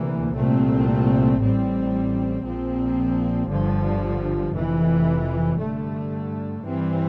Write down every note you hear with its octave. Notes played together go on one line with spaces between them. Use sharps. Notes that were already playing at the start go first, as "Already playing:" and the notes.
Already playing: D2 C3 E3 A#3
C2 A#2 A3 C4
A1 A2 G3 C4
A#1 A#2 F3 C4
G1 G2 D3 F3
F1 F2 E3
G2 D3 A3
G2 E3 G3 C4